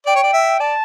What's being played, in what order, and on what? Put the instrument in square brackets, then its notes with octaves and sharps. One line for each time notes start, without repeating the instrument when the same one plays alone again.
[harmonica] D5 [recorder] G5
[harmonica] C#5
D5
E5
[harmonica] D5 [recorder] A5